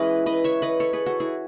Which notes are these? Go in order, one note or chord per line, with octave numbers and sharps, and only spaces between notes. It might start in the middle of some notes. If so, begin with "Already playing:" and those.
Already playing: E3 G#3 C#4 E4 B4 D#5
B4 D#5
C#5 E5
B4 D#5
A4 C#5
G#4 B4
F#4 A4
E4 G#4